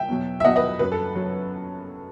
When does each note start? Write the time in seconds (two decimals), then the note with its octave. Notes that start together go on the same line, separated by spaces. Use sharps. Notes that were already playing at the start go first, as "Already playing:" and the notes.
Already playing: E5 G5
0.08 E2 B2 F#3
0.40 E5
0.44 E2 B2 F#3 D#5 F#5
0.56 B4 D#5
0.79 F#2 F#3 B4
0.92 A4
1.15 F#3